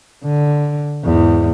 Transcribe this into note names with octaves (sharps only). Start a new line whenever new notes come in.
D3
E2 G#2